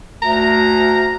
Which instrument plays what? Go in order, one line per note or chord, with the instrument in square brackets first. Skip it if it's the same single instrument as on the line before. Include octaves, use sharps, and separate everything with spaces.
[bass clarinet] D2 [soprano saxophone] A#5